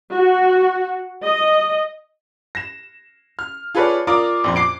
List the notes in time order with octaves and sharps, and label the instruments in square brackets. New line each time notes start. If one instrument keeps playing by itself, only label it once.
[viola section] F#4
D#5
[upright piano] A#6 E7
F6
F4 G#4 A4 B4 C#5 D5
F4 A#4 D5 A#5 D6 D#6
A#1 F2 C6
D6 C7 D7